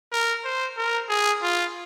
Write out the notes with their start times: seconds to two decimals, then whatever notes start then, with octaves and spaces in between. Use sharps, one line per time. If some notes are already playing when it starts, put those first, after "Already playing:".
0.12 A#4
0.44 C5
0.77 A#4
1.09 G#4
1.43 F4